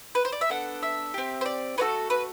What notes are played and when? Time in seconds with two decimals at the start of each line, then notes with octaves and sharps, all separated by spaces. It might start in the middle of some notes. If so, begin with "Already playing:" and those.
0.15 B4
0.25 C5
0.32 D5
0.41 E5
0.50 B3 D4 A4 F#5
0.83 E5
1.14 C4 G4
1.41 C5
1.46 D5
1.78 A3 D4 F#4 A4 B4
2.10 B4